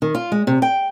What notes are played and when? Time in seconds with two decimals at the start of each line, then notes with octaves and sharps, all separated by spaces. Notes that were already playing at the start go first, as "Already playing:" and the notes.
0.02 D#3
0.15 F4
0.32 G#3
0.47 C3
0.62 G5